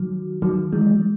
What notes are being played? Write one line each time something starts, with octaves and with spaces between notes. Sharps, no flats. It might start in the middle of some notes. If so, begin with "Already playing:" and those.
Already playing: D#3 F#3
D#3 F#3
E3 G#3
G#3